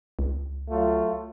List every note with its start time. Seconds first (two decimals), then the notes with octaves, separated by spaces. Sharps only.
0.19 C#2
0.70 F#3 A3 F4